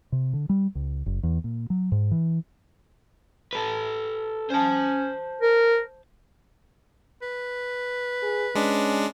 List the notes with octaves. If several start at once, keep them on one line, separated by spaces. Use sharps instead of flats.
C3
D3
G3
C#2
F#1
E2
A#2
F#3
G#2
E3
A4 B4
C#4 C5 A5
A#4
B4
G#4
G#3 C#4 D4